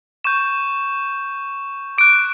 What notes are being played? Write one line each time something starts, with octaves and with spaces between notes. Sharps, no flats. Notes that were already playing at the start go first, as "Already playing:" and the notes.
C#6 G6 E7
D6 F#6 D7